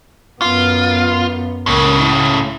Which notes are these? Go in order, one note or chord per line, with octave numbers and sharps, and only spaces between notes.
F#2 B3 F4
C#2 A2 C#3 A#3
E4